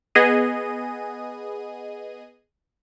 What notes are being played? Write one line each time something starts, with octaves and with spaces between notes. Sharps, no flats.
B3 G#4 D#5 D#7